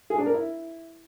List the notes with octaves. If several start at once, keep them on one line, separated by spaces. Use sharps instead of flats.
G#4
D4
A#4
E4